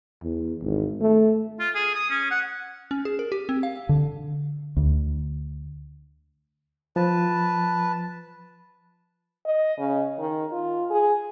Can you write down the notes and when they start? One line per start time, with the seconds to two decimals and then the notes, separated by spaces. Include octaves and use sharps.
0.22 E2
0.62 G#1
1.01 A3
1.60 F4
1.75 G#4
1.95 D#6
2.10 C#4
2.31 F#5
2.91 C#4
3.05 G#4
3.19 A#4
3.32 G4
3.49 C4
3.63 F5
3.89 D3
4.77 D2
6.96 F3 B4 A5
9.45 D#5
9.79 C#3
10.19 D#3
10.52 F4
10.90 G#4